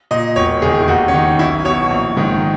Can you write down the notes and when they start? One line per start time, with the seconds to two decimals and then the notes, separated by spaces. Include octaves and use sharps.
0.11 A#2 D#5
0.36 E1 C#5
0.62 D#2 D#3 G#4
0.79 E4
0.88 D#2 F#4
1.08 C#4
1.13 D#3 D#4
1.39 B1 E4
1.65 B2 C#5
1.91 A#1
2.17 G#2 D#3